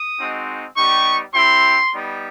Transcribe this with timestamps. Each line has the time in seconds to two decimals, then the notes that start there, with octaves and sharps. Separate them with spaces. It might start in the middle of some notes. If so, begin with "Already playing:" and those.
Already playing: D#6
0.19 G#3 C4 D#4 F#4
0.76 G3 B3 D#4 G4 C#6
1.33 C4 E4 G4 C6
1.91 G3 B3 D#4